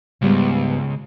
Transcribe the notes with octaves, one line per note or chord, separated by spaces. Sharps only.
C#2 G#2 G3 B3